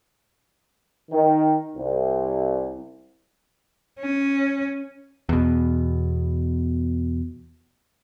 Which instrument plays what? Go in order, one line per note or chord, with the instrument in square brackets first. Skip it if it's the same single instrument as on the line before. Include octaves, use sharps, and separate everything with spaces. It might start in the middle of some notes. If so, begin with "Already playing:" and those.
[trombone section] D#3
C2
[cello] C#4
[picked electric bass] E2 B2